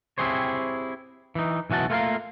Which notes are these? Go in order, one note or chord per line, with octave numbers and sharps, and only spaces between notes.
C4 E4 G4 G#4 C5 C#5
E3 D#4
B1 E3 C#4 F#4 A5
A3 A#3 F4 G#4 A#4 F5